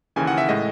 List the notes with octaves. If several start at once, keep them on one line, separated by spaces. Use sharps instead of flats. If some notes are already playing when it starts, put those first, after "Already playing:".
D#2 C#3 E3 G#5
F#5
E5
A2 G#3 D#5